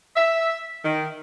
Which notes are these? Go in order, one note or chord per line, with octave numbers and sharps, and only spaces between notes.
E5
D#3